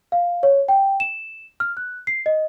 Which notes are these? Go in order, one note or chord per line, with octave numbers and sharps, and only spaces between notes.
F5
C#5
G5
E7
F6
F#6
C7
D#5